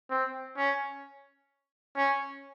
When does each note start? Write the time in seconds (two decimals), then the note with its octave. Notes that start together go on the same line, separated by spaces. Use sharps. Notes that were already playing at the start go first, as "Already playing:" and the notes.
0.10 C4
0.57 C#4
1.96 C#4